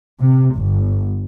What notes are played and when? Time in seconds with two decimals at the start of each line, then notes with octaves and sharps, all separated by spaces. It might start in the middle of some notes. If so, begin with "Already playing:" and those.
0.20 C3
0.55 G1